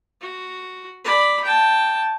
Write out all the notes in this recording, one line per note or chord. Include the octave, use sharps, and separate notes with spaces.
F#4
D5 B5
G5 A5